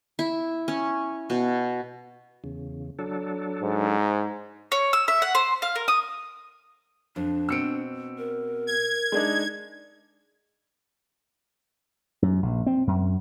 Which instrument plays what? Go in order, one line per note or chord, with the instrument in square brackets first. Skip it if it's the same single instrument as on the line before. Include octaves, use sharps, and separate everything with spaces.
[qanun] E4
C#4
B2
[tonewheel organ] E2 C#3
F#3 D4 A4
[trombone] G#2
[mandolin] C#5
E6
E5
F#5
C5
F5
A#4
D#6
[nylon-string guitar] F2 [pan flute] D4
[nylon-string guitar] B2 C4 [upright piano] E6 C#7 D7
[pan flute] A#4
[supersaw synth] G#6
[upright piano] G#3 D4 D#4
[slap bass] F#2
A#1
C4
F#2